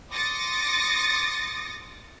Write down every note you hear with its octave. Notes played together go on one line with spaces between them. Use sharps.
C6 D6 D#6 A6 A#6 C#7